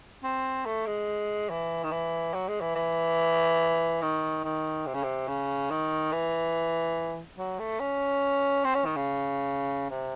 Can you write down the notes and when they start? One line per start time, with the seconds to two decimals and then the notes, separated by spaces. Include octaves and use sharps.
0.24 C4
0.66 A3
0.87 G#3
1.50 E3
1.84 D#3
1.92 E3
2.34 F#3
2.48 G#3
2.61 E3
2.76 E3
4.02 D#3
4.44 D#3
4.86 C3
4.94 C#3
5.03 C3
5.28 C#3
5.71 D#3
6.12 E3
7.38 F#3
7.59 A3
7.80 C#4
8.65 C4
8.75 C#4
8.86 D#3
8.96 C#3
9.91 C3